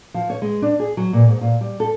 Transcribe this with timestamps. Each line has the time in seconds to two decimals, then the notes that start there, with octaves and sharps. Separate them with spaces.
0.14 F3
0.30 C#5
0.42 G#3
0.62 D4
0.80 G#4
0.97 F#3
1.13 A#2
1.28 G#2
1.41 A#2
1.61 G3
1.80 A4